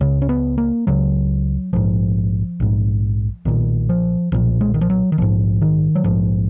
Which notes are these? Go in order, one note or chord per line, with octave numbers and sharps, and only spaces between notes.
C#2 C#3 C#4
C#4
B3
A#3
C#2 C#3 F#3
A#1 G#2 F3
A#1 G#2
B1 A#2 D#3
F3
B1 A#2 F3
G#3
D#3
F3
F#3
D#3
A#1 G#2 F3
D#3
F#3
A#1 G#2 F3